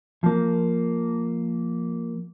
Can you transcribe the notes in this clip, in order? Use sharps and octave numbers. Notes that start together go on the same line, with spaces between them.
F3 A#3